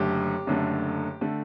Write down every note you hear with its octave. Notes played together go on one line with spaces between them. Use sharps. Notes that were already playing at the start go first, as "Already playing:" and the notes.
Already playing: F#1 F#2 D3 A3 G4
F#1 F#2 D3 A3
D3 A3